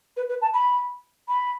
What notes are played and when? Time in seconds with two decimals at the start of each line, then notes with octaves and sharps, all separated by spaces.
0.17 B4
0.29 B4
0.42 A5
0.54 B5
1.28 B5